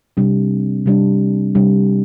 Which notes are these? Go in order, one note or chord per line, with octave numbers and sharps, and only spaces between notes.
C3 G3 D4
C3 G3 D4
C3 G3 D4